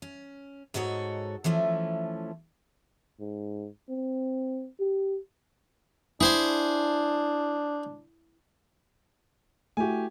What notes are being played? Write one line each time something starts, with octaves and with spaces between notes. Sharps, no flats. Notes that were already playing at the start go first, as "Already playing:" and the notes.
C#4
G#2 D#4 F#4 A4 C#5
E3 F3 A3 C#4
G#2
C4
G4
D4 E4 G#4 C5 G#5
A3 E4 F#4 G4 G#5